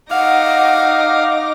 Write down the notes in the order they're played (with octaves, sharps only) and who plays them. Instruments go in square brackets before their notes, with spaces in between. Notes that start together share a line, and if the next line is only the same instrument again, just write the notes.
[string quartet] D#4 D6 A#6 [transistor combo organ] F5 [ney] F#5